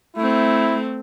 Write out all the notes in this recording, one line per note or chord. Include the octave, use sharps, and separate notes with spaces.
A3 C4 E4